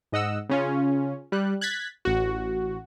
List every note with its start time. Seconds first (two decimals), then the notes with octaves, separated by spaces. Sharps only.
0.12 G#2 D#5 F#5 E6
0.49 C#3 C#4 F4
1.32 G3 F#6
1.61 F#6 G#6 A6 B6
2.05 A1 F#4